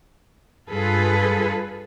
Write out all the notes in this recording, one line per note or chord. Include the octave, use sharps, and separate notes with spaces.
G2 F4 G#4 A4 B4